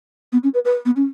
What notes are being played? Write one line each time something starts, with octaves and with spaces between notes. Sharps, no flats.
B3
C#4
B4
B4
B3
C#4